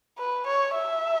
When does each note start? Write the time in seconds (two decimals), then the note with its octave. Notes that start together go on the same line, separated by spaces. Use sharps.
0.18 B4
0.47 C#5
0.75 E5